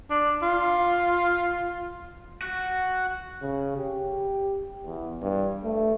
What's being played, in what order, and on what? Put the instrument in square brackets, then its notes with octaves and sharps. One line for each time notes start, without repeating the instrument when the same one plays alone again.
[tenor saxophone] D4
F4
[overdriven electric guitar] F#4
[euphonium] C#3
G4
E2
G2
A3